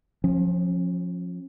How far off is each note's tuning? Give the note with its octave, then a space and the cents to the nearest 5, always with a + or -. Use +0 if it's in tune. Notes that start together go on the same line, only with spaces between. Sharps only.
F3 +15 C#4 -35